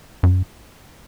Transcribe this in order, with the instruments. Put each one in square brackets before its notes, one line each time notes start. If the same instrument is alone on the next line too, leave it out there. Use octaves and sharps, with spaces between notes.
[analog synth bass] F#2